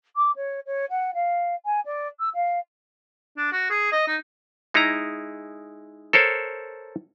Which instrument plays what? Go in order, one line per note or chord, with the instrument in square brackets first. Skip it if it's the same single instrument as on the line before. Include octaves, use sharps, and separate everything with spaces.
[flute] D6
C#5
C#5
F#5
F5
G#5
D5
E6
F5
[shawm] D4
F#4
G#4
D#5
D#4
[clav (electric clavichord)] G#3 D#4 E4 G#4 A#5
A4 A#4 C5 C#5 A5